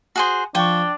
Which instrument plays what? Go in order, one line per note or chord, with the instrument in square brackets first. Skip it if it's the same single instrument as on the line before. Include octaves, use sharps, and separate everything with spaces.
[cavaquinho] F#4 G#4 C5
[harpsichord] F3 C#6 [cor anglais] D4 [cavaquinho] G5